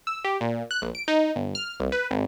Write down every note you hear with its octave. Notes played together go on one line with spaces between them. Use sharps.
E6
G4
A#2
F#6
A#1
D7
D#4
G1
F6
C2
B4
G#1